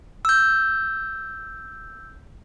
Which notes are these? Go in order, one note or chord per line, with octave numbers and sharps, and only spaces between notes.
E6 G6